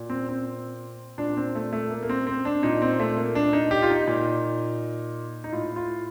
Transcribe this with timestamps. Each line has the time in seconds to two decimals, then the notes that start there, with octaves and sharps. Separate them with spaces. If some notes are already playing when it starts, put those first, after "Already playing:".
Already playing: A#2
0.10 C4
0.29 C4
1.18 A#2 D4
1.37 C4
1.55 A3
1.72 A3
1.90 A#3
2.03 A#3
2.09 C4
2.27 C4
2.45 D4
2.63 A#2 D#4
2.82 C4
3.00 A3
3.17 A#3
3.35 D4
3.53 D#4
3.71 G4
3.82 F4
3.90 D#4
4.07 A#2
5.44 D#4
5.52 A2 F4
5.76 F4